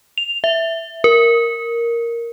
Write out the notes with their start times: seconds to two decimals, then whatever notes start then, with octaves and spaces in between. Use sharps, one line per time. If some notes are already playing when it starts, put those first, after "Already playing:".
0.18 F7
0.44 E5
1.04 A#4